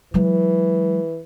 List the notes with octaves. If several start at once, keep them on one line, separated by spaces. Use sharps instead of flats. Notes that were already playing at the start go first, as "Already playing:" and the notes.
E3 F#3 G#3